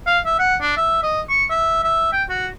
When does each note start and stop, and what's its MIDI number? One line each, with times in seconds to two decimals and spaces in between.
0.07 0.19 77
0.26 0.35 76
0.39 0.56 78
0.61 0.73 62
0.77 1.03 76
1.03 1.21 75
1.29 1.44 85
1.50 1.80 76
1.83 2.12 76
2.12 2.23 79
2.29 2.47 66